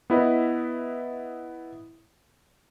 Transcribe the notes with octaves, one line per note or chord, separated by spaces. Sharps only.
B3 E4 B4 D#5